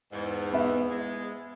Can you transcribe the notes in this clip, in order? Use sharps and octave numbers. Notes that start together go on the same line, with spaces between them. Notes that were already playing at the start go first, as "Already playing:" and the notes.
E2 G#2
B3 E5
G#3